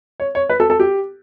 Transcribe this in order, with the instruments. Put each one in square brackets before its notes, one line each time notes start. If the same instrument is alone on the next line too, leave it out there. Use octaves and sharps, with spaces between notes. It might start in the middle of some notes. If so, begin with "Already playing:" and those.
[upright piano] C#5
C#5
B4
A4
A4
G4